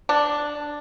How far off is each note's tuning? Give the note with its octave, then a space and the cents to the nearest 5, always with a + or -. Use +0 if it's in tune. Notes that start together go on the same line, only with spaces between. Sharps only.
D4 +0